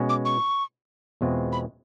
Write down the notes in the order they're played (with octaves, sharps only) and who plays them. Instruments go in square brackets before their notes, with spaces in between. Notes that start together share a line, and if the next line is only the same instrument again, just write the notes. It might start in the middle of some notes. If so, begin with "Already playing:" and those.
Already playing: [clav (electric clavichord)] B2 G#3 C#4 F#4
[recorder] D6
C#6
[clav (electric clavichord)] E2 B2 G#3 C4 F4
[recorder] B5